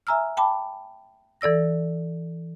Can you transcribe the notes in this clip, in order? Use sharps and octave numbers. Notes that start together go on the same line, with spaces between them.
E5 G#5 A#5 E6 F6
G5 A5 B5 D6
E3 A4 D5 E6 A#6